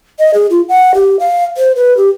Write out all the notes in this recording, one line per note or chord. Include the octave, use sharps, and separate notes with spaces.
D#5
G#4
F4
F#5
G4
F5
C5
B4
G4